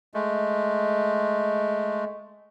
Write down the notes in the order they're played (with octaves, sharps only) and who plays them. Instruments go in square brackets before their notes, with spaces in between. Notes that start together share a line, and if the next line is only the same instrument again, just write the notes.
[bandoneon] G#3 A3